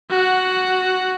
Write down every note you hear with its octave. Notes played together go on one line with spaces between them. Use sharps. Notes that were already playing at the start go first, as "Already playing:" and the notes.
F#4 F#5